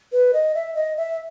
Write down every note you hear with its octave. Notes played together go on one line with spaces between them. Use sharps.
B4
D#5
E5
D#5
E5